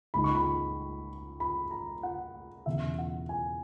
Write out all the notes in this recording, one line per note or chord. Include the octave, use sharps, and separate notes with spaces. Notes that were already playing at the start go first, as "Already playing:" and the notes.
C#2 C#3 G#3 D#4 B5
C#6
B5
B5
A#5
F#5
E1 E2 C#3 E5
F#5
G#5